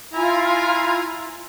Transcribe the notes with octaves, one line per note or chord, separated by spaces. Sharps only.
E4 F4 G#5 A#5